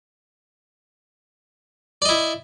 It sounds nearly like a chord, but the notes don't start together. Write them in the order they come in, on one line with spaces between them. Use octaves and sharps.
D5 D#5 E4